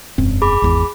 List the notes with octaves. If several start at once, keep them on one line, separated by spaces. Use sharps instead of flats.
E1 F#2 C4
G#4 B5 D6
G#1 E2